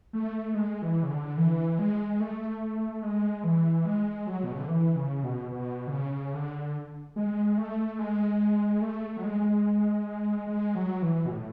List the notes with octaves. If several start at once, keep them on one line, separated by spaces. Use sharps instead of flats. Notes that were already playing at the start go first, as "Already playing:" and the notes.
A3
G#3
E3
C#3
D3
E3
G#3
A3
G#3
E3
G#3
F#3
B2
C#3
D3
E3
C#3
B2
B2
D3
C#3
D3
G#3
A3
G#3
A3
F#3
G#3
G#3
F#3
E3
B2
A2